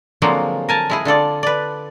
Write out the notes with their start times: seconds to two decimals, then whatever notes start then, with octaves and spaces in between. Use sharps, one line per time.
0.22 D3 F3 F#3 G#3 A#3 C4
0.69 A#4 G#5 A5
0.90 G#3 E4 G#4
1.05 D3 F4 A4 D5
1.43 B4 D5